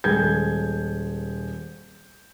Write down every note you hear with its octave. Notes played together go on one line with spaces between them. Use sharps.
D#1 G#3 G6 G#6